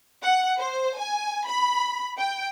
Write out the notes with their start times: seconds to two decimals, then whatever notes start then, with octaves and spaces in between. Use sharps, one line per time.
0.22 F#5
0.58 C5
0.97 G#5
1.46 B5
2.18 G5